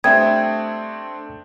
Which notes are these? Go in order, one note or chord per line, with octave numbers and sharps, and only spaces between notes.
G3 A3 C4 D4 E5 G5 D#6 G#6